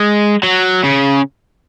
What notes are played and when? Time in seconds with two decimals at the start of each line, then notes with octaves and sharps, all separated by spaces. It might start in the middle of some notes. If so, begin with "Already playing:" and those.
Already playing: G#3
0.43 F#3
0.84 C#3